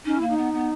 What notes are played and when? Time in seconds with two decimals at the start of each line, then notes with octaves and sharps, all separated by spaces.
0.05 C#4 D#4
0.17 A#3 E4
0.29 D#4
0.37 B3
0.53 B3